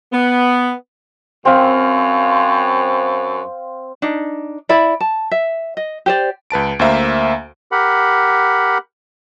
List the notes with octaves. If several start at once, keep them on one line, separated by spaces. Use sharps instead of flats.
B3
F#2 C4 F5
D4 D#4
E4 D5 E5 B5
A5
E5
D#5
G4 C5 D5
C#2 B4 A5 D7
D2 A#3 C5 E5 F5 A#5
G4 A#4 F#5 B5